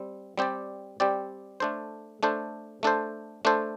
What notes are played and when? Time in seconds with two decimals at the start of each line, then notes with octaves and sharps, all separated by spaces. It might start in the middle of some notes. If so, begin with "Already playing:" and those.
Already playing: G3 C4
0.38 G3 C4 G4 D5
1.00 G3 C4 G4 D5
1.60 A3 D4 A4 C5
2.23 A3 D4 A4 C5
2.83 A3 D4 A4 C5
3.45 A3 D4 A4 C5